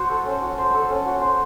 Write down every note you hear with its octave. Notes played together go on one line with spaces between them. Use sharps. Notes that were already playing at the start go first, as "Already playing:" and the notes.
Already playing: F#4 C5
A4
C#4
F#4
C5
A4
C#4
F#4
C5